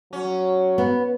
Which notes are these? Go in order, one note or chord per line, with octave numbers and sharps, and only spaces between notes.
F#3 C#4
B3